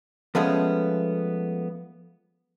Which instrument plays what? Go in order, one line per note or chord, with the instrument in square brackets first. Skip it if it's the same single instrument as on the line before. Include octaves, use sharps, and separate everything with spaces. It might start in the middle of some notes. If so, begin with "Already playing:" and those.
[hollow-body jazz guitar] F3 G#3 A3 B3 C#4